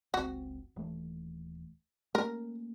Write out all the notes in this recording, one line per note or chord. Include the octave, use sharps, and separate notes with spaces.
F#1 C#2 C4 F#4
D#1 E3 A3
A3 A#3 C#4 A#4